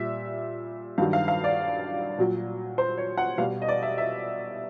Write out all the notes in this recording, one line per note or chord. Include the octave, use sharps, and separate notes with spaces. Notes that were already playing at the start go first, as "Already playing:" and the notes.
Already playing: A#2 G3 E5
G2 D#3 F#3 F5
F5
F5
D5
A#2 F#3
C5
C#5
F#5
B2 G3 F5
D#5
D5
E5
E5